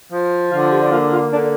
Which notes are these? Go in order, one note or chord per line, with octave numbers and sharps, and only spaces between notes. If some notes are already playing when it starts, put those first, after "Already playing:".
F3
D3 F4
G4
D4
A#3 F4
F4
D3 D4